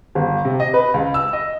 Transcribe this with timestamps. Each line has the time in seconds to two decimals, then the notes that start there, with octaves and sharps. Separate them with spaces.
0.15 G1
0.45 C3
0.60 D#5
0.74 B4
0.94 C#2
1.14 E6
1.33 D#5